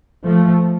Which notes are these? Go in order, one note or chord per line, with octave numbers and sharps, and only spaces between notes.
F3 A3